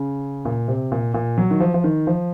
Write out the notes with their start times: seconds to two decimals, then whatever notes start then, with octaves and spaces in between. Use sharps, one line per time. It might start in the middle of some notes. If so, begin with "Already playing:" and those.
Already playing: C#3
0.45 A#2
0.68 C3
0.92 A#2
1.14 A#2
1.38 F#3
1.51 D#3
1.60 F3
1.74 F3
1.84 D#3
2.07 F3